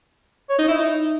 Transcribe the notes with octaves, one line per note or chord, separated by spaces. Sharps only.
C#5
D#4
E4
D#4